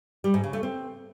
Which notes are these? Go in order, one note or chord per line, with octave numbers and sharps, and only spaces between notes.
G3
G#2
C#3
A3
C4